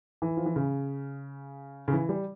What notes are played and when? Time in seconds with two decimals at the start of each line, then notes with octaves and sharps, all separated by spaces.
0.22 E3
0.37 F3
0.46 E3
0.56 C#3
1.88 C#3
1.92 E3
2.09 G3